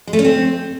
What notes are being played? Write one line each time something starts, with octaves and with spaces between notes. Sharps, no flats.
G#3
A3
C#4
C4